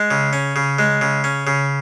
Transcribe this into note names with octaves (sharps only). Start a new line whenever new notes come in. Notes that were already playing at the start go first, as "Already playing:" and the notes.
Already playing: G#3
C#3
C#4
C#3
G#3
C#3
C#4
C#3